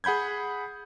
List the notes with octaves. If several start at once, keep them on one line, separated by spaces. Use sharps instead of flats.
G#4 F#5 B5 G6 G#6